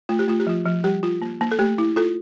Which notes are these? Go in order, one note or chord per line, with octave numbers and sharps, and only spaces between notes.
A3 F4
G4
A3 F4
G4
F3 F4
F3
G3 G4
F4
A#3
A#3
A4
A3 G4
E4
F4 A4